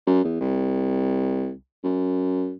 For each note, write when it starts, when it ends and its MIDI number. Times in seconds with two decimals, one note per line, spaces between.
0.07 0.22 42
0.25 0.40 40
0.41 1.52 36
1.84 2.54 42